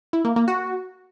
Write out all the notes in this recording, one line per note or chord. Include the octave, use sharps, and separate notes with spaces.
E4
A#3
A#3
F#4